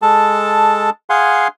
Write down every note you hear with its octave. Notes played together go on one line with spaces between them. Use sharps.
G#3 A4 A5
G#4 F5 F#5 G#5 C6